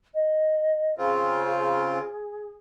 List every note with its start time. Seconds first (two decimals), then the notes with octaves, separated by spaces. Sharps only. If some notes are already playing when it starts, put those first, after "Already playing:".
0.14 D#5
0.98 C#3 C4 F4 G#4